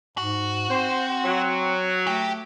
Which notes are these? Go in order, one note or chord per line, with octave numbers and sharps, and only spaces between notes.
G#2 F#4
C4 C5
F#3
A3 G4 G5